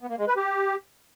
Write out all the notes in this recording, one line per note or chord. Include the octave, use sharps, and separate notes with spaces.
B3
A#3
G#3
B4
G4